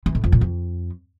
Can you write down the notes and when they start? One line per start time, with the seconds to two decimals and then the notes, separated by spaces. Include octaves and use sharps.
0.06 E3
0.15 A2
0.24 F2
0.32 A#2
0.41 F2